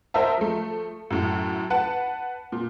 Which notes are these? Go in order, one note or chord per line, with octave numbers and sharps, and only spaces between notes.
A#4 C5 D#5 E5 A5
F3 A3
F#2 A2
B4 F#5 A5
A#2